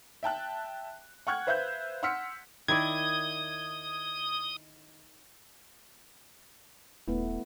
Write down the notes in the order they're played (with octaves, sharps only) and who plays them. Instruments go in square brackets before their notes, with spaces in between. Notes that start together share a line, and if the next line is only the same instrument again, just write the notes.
[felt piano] E5 G5 A5 F#6
F#5 G5 C#6 F6 F#6 G#6
B4 C5 E5 F5 F#6 G6
F#5 C6 E6 F6 B6 C#7
[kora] D#3 E4 D5 [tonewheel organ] D#6 [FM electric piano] G#6
[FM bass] D#1 [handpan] A3 B3 E4